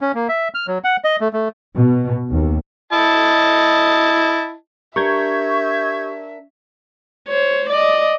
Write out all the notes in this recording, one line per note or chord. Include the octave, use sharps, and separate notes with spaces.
C#4
A#3
E5
F6
F#3
F#5
D#5
A3
A3
B2
D#2
E4 D#5 A5
D4 G4 A#4 E5 C#6 G6 G#6
C5 C#5
D5 D#5